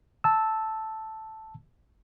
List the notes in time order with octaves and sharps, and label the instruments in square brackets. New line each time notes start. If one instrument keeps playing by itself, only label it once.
[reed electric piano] A5 E6